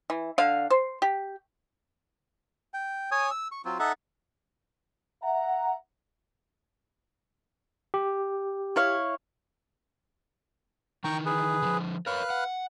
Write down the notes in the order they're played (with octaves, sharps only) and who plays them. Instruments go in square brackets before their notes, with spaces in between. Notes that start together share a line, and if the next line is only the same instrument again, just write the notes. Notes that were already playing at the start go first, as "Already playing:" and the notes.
[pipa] E3
D3 F5
C5
G4
[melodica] G5
C#5 G#5 D#6
E6
C#6
F#3 C4 F4
D#4 A4 E5 F#5
[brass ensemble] E5 F#5 A#5
[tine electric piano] G4
[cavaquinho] E4 C#5 F5
[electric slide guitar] D#3 E3 D#4 [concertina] G5 A#5 C#6
[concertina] G#4 B4
[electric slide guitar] D3 F3
[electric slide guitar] A#4 C#5 [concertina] B4 F5 F#6
[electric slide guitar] F#5